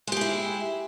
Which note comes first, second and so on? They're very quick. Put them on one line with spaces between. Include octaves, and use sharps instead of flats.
G#3 G4 G#4 E4